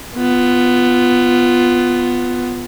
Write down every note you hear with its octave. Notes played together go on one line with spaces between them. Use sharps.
B3 F4